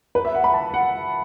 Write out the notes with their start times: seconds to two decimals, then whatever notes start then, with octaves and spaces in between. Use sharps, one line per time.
0.15 B4
0.25 E5
0.34 F#5
0.44 B5
0.54 A5
0.74 F#5